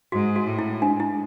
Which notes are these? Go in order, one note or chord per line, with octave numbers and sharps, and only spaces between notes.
G#2 F#4
F#4
A2
E4
G#2 D4
E4